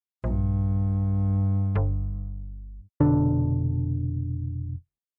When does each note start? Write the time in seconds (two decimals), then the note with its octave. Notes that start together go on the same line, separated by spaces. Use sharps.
0.24 A#1 G2
1.75 G1
3.00 F1 B2 D3 D4